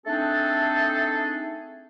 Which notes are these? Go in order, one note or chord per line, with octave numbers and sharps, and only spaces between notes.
A3 C4 D4 D#4 G#4 A4